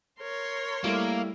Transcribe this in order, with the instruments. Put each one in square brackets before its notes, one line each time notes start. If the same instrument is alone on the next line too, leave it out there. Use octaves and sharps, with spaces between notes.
[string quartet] A#4 C#5 C6
[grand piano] G3 A3 E4 [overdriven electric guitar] A#3